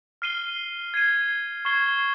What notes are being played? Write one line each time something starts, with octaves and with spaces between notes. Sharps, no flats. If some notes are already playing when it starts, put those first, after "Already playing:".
F6 C7 D#7 G7
G#6 C7 D#7
C#6 F6 G#6 C7 G7